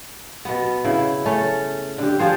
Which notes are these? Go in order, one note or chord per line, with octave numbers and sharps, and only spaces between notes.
B2 B3
C#3 E4
A3 C#4
D3 G4
F3 G#4 C5